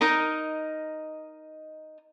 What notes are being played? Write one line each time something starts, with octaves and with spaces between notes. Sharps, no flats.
D#4 A#4 D#5